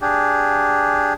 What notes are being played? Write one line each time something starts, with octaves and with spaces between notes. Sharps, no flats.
D4 G4 G#4